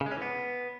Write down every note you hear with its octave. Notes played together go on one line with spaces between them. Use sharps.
C#3
G#3
C#4
E3
B3